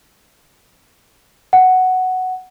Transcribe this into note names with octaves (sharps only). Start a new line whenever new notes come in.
F#5